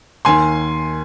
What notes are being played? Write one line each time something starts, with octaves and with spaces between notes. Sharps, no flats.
D#2 D#3 G#5 C6